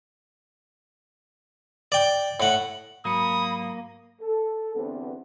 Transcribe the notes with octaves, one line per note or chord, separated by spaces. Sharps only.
D5 G5
A2 F#5
G#2 F#3 A#3 B5 D#6 C#7
A4
E2 G2 D3 B3 C4 D4